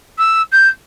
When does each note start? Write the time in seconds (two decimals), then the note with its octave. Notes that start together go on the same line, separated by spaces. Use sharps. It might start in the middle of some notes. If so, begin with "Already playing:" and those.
0.18 E6
0.51 G6